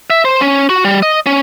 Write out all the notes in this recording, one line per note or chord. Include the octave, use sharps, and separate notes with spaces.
E5
C5
C#4
F#4
G3
D#5
C#4